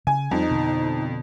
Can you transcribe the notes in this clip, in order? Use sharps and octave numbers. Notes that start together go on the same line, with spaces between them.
C#3 G#5
F2 G3 D#4
B2 D3